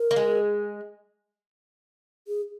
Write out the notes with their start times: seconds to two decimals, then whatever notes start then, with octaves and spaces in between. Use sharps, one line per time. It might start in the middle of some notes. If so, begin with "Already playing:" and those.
Already playing: A#4
0.11 A#3
0.16 G#3
2.27 G#4